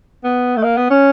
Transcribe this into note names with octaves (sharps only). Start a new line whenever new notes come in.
B3
A3
A#3
B3
C#4